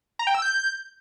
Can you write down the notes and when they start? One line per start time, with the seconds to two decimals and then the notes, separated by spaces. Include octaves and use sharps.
0.19 A#5
0.27 G5
0.35 E6
0.42 G6